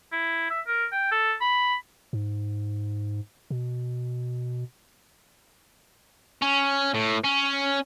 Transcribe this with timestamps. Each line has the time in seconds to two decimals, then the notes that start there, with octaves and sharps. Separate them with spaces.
0.12 E4
0.50 E5
0.67 A#4
0.92 G5
1.12 A4
1.41 B5
2.13 G#2
3.50 B2
6.42 C#4
6.94 A2
7.24 C#4